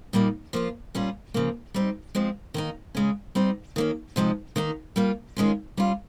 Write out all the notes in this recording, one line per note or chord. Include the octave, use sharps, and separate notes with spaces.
A#2 G3 A#3 D#4
F3 A#3 F4
A#2 G3 C#4 F4
C#3 F3 A#3
G3 C4 D#4
F3 G#3 C4
D#3 A#3 D#4
C#3 G#3 C#4
G3 C4 D#4
D#3 A#3 C#4
C3 F3 G#3 D#4
D#3 A#3 D#4
G3 A#3 F4
D#3 G#3 C#4 F4
G3 C#4 F4